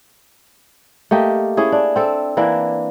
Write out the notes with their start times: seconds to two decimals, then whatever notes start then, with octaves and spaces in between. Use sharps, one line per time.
1.11 A3 A#3 G4 D#5
1.57 C#4 E4 G#4
1.72 D4
1.96 C4 A4
2.37 E3 A#3 D4 E4